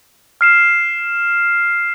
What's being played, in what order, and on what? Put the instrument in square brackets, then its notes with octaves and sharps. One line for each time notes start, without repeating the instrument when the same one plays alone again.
[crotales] F6 C7 E7